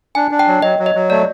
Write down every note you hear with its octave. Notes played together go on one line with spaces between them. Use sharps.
D4 G#5
D4
G5
F#3
F#3 D#5
F#3
D#5
F#3
A3 D5